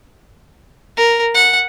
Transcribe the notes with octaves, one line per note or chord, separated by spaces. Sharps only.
A#4
F#5